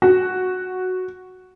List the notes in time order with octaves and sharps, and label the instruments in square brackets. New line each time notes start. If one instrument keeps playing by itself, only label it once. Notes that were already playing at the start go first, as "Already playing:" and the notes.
[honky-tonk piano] F#4